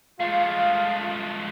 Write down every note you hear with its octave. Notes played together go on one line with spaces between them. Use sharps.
G#3 A3 F4 F5